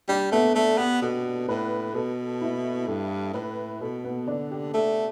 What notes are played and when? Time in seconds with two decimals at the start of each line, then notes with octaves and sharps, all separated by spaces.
0.09 G3 D4
0.32 A3 B3
0.55 A3
0.78 B3 G4
1.02 B2 A4
1.48 A2 B4
1.95 B2 A4
2.41 E4
2.88 G2 A4
3.34 A2 B4
3.82 B2 A4
4.04 B3
4.27 D3 D4
4.51 G4
4.74 A3 A4